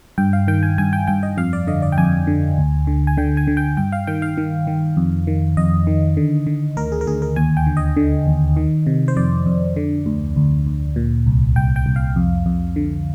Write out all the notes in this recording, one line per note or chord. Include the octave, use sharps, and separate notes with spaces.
G2 G5
F5
D#3 G5
G#5
G2 G#5
G5
G2 G5
D#5
F2 F5
D5
D3 D#5
D5
G5
F2 G#5
D3
D2
D3
G#5
D3 G5
G#5
D3
G5
G2 G5
F5
D#3 G5
F5
D#3
D#3
F2
D#3
F2 D#5
D#3
D3
D3
D2 A#4
G#4
A#4
D2 G#4
A#4
D#2 G#5
G5
D3
D#5
D3
D#2
D#3
C3
C5
F2 D5
F2
D3
D2
D2
D2
A#2
C2
C2 G5
G5
C2
F5
F2
F2
D3